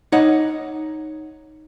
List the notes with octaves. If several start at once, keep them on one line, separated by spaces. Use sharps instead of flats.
D#4 C#5 F#5